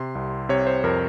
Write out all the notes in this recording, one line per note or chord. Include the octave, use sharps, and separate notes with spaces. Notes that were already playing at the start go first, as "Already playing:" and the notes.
Already playing: C3 C6
C2
C3 C#5
C5
F2 A#4